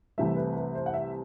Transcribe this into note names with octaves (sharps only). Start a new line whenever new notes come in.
C2 C3 E3 A3 E5
B4
B4
C5
F#5
E5